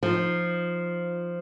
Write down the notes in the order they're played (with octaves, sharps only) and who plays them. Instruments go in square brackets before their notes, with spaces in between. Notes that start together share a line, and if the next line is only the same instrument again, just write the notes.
[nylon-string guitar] F3 D#4